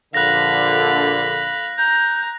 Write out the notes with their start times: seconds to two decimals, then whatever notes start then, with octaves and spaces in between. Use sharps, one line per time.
0.14 A#1 D3 F5 B5 F#6 A#6
1.78 A#5 G6